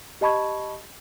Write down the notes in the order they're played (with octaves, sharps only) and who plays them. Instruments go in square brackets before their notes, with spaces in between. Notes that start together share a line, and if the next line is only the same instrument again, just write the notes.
[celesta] G4 D#5 A5 B5 C#6 G#6